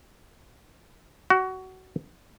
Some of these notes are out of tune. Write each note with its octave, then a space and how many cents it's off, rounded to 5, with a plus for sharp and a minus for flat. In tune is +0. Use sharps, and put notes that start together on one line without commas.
F#4 +20